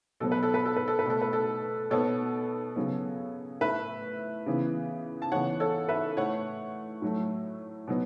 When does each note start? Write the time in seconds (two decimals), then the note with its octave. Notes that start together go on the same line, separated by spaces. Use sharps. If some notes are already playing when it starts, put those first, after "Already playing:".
0.20 B2 F#3 B3 A4
0.32 B4
0.43 A4
0.54 B4
0.65 A4
0.76 B4
0.88 A4
0.99 B4
1.06 B2 A3 A4
1.21 B4
1.33 A4
1.90 B2 B3 A4 C#5
2.76 C#3 F#3 B3
3.61 A2 A3 B4 E5
4.46 C#3 E3 B3
5.22 A5
5.32 C#3 E3 B3 C#5 F#5
5.60 A4 C#5
5.89 B4 E5
6.17 A2 A3 C#5 F#5
7.02 A2 F#3 A3
7.87 B2 F#3 B3